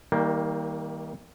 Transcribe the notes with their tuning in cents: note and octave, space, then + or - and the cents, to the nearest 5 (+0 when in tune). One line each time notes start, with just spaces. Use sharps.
D#3 +35 G3 +0 A#3 +0